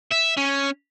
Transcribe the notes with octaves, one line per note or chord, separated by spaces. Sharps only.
E5
C#4